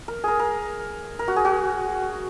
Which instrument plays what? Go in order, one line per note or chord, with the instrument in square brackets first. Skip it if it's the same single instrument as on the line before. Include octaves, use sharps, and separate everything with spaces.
[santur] A#4
G#4 A#4
A#4
A#4
F#4
G#4
F#4